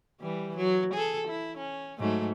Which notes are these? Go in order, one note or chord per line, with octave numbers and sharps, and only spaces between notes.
E3 G3
F#3
G#4 A4
E4
C#4
G#2 F#3 A3